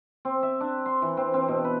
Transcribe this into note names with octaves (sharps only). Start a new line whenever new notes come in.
C4
E5
D4
C6
E3
C4
C4
B2
B4